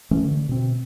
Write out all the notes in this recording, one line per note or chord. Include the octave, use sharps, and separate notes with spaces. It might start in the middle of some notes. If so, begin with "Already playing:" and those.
E3 A3 C#4
D3
B2 C4